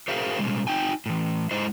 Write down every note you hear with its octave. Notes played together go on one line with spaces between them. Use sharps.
F#4 G#4 A#4 C5 E5 F5
B2 G3 G#3
F#3 D#4 G5 G#5
A2 E3
G#3 E4 C5 D#5